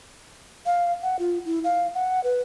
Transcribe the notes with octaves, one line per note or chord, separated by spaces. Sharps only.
F5
F#5
F4
E4
F5
F#5
B4